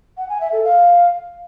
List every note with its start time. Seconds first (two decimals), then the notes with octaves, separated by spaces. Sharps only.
0.17 F#5
0.29 G#5
0.41 E5
0.52 A4
0.64 F5